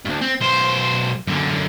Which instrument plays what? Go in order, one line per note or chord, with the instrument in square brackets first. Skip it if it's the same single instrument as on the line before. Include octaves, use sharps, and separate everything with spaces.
[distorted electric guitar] D2 G2
C4
B1 C5
F#2 D3